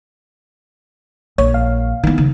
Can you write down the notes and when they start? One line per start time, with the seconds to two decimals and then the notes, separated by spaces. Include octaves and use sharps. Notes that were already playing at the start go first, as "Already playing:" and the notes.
1.38 A#1 C#5
1.54 F5
2.03 D#3 E3 B3
2.18 C#3